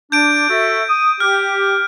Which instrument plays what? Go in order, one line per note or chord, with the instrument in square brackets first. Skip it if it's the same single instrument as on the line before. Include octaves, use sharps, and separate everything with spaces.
[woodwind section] D4 [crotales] G6 D7
[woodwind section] F#4 A4 E5
D#6
[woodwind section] G4 [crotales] F6